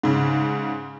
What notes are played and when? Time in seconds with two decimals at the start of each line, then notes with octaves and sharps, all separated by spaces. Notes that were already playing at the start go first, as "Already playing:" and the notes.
0.03 G#2 C#3